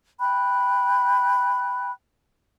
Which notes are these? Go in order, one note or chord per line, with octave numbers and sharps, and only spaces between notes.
G5 B5 F#6